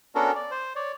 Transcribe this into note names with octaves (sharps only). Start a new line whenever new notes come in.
B3 C#4 D4 F#4 A4 A#4
D5
C5
C#5 D5